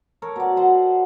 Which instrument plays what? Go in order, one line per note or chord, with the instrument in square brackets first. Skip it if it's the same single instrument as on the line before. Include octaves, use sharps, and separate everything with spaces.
[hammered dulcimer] A4 A#4 C#5 A5
B2 D5
F#4 C5 F#5